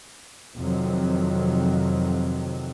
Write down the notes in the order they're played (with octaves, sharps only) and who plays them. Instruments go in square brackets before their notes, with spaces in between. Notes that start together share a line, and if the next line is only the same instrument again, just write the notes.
[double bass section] F2 C3 D#3 F#3